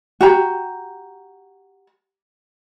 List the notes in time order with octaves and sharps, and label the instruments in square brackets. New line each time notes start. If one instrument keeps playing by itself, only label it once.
[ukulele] F#4 G4 A#5